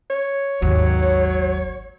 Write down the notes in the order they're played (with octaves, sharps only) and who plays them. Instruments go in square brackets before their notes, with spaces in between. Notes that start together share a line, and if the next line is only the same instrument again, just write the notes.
[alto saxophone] C#5
[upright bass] G#1 D#2 [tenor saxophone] F#3